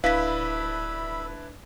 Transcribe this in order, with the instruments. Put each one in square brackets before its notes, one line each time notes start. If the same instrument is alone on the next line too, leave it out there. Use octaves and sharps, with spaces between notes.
[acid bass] D1 [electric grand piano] D4 E4 B4 [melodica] E5 B5 [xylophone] F5 B6